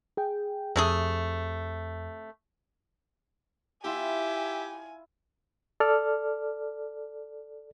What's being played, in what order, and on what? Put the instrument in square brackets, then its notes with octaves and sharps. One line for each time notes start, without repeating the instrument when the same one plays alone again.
[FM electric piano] G#4 G5
[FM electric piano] F2 [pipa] C3 A3 G#4
[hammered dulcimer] E4 F4 G5 [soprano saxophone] G4 [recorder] E5 [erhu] G#5
[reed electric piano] A4 D5 F6